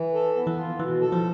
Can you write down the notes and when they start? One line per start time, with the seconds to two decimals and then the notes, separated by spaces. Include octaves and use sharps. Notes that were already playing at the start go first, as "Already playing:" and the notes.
Already playing: E3
0.14 A4
0.36 B3
0.47 E3
0.57 F4
0.80 B2 E3
1.01 A4
1.12 F3